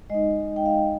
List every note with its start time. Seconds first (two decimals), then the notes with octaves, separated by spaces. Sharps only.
0.10 G#3 D#4 D#5
0.56 G5
0.66 F5